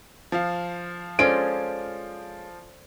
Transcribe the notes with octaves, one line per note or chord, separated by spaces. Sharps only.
F3 F5
G#3 C#4 F4 A4 C5 D5 D7